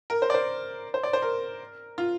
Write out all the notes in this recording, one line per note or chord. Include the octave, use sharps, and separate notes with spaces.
A#4
C5
D5
C5
C5
D5
C5
A#4
F4